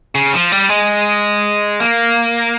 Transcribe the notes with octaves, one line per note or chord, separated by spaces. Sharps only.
C#3
F3
G3
G#3
A#3